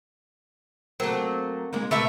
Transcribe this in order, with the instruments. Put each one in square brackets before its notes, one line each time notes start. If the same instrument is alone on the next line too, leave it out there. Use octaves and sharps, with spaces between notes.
[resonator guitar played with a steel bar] F#3 A3 [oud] A#3 C4 G4
[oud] G#3 A#3 D#4
[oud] B2 B4 [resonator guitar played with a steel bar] A3 A#3 E5